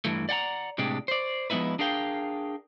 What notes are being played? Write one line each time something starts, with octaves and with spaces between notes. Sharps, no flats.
G2 E3 A3
D5 F#5 G5 A#5
A2 C3 G#3 D4 G4
C5 D5
F3 G#3 B3 D#4 E4 B4
D4 G#4 A#4 F5 G5